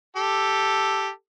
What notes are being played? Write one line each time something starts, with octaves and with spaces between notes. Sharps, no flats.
G4 A4